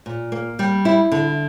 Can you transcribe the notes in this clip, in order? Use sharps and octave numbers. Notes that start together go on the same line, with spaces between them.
A#2
A#3
G3
E4
D3